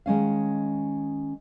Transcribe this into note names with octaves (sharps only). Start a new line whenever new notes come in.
D#3 G#3 C#4 F5